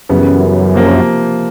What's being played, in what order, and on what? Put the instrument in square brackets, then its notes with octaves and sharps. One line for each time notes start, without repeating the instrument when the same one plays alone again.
[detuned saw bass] F#2 [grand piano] C#3 E3 G3 B3
[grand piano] C3 F3 A#3